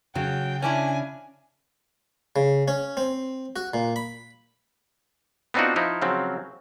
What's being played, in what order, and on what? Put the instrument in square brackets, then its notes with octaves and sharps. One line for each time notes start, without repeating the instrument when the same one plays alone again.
[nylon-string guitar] C#3 [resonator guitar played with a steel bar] F#3 [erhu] G5
[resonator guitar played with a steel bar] C#4 D4 E4 [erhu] G#5
[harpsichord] C#3
C#4
C4
F#4
A#2
B5
[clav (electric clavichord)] B3 C4 D4 D#4 F4 F#4
F3 D#4 E4
C#3 F3 F#3 C4